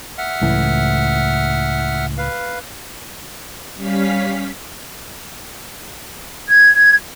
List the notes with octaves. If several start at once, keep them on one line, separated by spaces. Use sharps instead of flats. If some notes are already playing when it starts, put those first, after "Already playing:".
E5 F#5 F6
C#2 A2 E3
B4 F5
G3 C#4 F5 B6
G#6